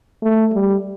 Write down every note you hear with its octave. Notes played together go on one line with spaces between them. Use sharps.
A3
G3